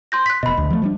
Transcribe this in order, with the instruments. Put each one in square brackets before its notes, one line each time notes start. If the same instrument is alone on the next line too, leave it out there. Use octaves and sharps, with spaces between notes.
[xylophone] C6 G6 A#6
F#6 B6
[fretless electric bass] F1 B2 [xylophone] D#5 B5
[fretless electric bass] D2
F3 A3
F3 G3 D4